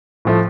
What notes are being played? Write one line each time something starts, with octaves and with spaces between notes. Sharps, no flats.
A2 F3 A3